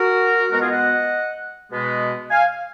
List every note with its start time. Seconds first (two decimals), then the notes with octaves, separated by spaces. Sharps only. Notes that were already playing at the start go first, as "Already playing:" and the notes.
Already playing: F#4 A#4
0.50 B2 G#3 B3 F#4 A#4
0.61 F4 G#4
0.71 D#5 F#5
1.71 B2 G#3 B3
2.30 F5 G#5